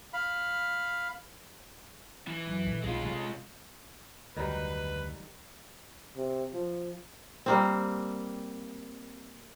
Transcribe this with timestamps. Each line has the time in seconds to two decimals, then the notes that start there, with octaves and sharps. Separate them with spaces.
0.13 F5 B5
2.28 E3
2.47 F#2
2.64 A#2 D3
2.83 B1 G#3 F4
3.03 C3 A3
4.36 F1 D2 D#3 F#3 G3 B4
6.16 C3
6.53 F3
7.46 G3 A#3 C4